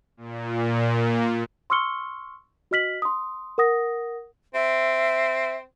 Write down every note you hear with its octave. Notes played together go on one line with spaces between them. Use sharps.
A#2
C6 C#6 E6 F6 C#7 G7
F#4 D#5 F6 B6 F#7
C6 D#6
A#4 F#5 D#6 A#6
C4 E5